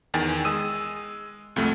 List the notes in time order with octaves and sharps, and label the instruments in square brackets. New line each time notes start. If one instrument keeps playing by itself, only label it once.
[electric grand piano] E2 D#3 G5 G#5 A6
G#3 D#6 E6 D#7
C2 F2 A3